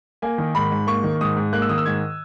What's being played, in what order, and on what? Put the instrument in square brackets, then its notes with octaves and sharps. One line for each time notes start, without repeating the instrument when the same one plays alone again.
[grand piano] A#3 G#5
D#3
G#2 B5
G#2
A#3 C#6
D#3
G#2 D#6
G#2
A#3 F#6
E6
D#3 D#6
E6
G#2 G#6